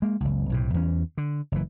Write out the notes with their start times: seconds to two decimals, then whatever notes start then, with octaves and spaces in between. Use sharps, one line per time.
0.02 G#3 A#3
0.20 F#1 C#2
0.49 B1 A2 C3
0.74 E2 E3 C#4
1.17 D3
1.52 F#1 E3